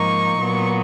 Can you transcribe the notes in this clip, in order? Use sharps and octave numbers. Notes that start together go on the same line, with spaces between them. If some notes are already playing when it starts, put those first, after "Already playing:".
Already playing: G#2 F3 A#3 D#4 C#6
A#2 F#3 B3